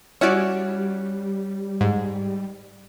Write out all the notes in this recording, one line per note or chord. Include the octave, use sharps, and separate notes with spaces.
G3 C#4 E4 F#4 C#5 D5
G#2